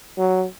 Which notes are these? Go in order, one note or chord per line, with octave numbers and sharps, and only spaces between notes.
F#3